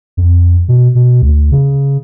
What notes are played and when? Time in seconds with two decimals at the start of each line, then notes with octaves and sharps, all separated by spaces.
0.17 F2
0.68 B2
0.95 B2
1.22 D2
1.52 C#3